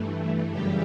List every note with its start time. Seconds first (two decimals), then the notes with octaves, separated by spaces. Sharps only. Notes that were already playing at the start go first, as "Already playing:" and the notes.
Already playing: G2 E3 A3
0.50 F#2 C#3 E3 G3 G4